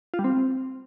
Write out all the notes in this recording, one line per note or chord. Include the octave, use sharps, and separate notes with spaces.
F4
G3
C4